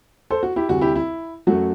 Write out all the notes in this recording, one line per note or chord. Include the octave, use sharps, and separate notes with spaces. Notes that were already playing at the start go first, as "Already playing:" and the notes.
A4 C5
F#4
E4 G4
D2 C3 G3 F#4
E4 G4
E4
F#2 F#3 A3 F#4